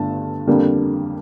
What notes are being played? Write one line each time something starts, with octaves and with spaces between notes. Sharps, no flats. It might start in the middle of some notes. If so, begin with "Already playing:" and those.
Already playing: G1 G2 D3 A3 A5
F2 D3 G3 A#3